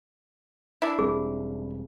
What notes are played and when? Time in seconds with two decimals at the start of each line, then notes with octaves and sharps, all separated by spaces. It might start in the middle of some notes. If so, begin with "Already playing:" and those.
0.82 D4 E4
0.99 E1 G3 C4 G#4